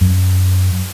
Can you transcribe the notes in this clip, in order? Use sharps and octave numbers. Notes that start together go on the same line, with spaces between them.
F#2